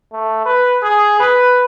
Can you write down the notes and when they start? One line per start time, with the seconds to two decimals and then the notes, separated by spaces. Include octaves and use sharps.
0.13 A3
0.45 B4
0.83 G#4
1.20 B4